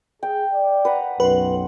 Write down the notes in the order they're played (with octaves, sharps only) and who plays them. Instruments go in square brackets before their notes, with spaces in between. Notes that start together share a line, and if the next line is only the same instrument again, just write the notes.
[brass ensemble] G#4 [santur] G5
[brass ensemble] D5
[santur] B4 F#5 A#5
[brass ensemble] B1 F#2 [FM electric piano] B4 [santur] F#5 C6